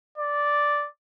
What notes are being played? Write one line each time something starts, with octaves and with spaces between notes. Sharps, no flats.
D5